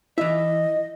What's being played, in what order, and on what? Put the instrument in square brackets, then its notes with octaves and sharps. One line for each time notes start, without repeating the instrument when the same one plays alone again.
[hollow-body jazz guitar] E3 E5 [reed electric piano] E4 [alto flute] D#5